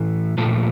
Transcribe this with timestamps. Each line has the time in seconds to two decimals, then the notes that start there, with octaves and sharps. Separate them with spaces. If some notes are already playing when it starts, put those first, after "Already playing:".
Already playing: A2 E3 A3
0.38 A#2 F3 A3 A4